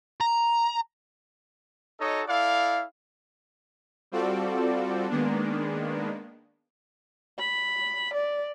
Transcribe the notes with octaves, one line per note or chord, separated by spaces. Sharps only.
A#5
D#4 F#4 A4 C#5 D#5
E4 A4 D5 F5
G3 C4 F4 F#4 A4 D5
D#3 G#3 A#3 B3 D4
B5
D5